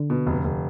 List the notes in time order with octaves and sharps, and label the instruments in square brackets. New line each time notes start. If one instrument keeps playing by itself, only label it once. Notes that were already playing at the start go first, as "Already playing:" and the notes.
Already playing: [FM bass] D3
[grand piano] B2
F1
F1